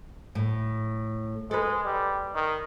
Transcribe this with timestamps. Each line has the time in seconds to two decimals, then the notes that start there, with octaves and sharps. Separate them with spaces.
0.35 A2
1.51 G#3 A4 B4
1.84 G3
2.35 D#3